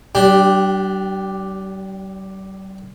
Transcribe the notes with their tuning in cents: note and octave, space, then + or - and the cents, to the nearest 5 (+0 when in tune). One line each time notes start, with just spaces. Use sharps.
G3 -40 D4 +0 G4 +0